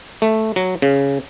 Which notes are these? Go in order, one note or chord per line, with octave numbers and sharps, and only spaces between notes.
A3
F#3
C#3